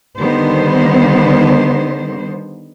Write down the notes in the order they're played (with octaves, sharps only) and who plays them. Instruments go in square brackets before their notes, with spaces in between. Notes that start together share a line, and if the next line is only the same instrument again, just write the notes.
[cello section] D3 D#3 G3 B3 C5